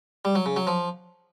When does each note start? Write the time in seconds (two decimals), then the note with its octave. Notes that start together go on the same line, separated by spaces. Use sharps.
0.25 G3
0.35 F#3
0.46 C#3
0.57 F#3
0.67 F3